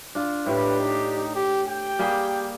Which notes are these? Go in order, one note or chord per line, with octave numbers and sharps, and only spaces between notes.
D4 F4
A2 D4 G4 B4
D#4
G4
G4 G5
G3 A#3 G#4